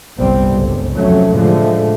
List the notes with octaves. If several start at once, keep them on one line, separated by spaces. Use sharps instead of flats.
G1 C2 A2 C3 G3 C4
G1 C#2
F1 F2 F#3 A3 C#4
A2 D3 F3 G#3 A3